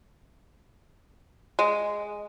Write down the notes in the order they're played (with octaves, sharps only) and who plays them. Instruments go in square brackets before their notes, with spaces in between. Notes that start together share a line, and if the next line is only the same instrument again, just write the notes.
[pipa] G#3